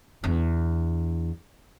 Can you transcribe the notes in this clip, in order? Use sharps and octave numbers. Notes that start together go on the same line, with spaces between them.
E2 D4